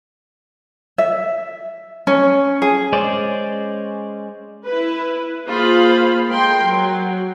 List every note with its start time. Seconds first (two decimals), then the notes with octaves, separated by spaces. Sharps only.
0.98 E5
2.07 C#4
2.62 G#4
2.93 G#3 C#4 C5 D5
4.65 E4 B4
5.47 A#3 F4 G#4 C5 F5 B5
6.29 G#3 A#4 G5 C6
6.63 F#3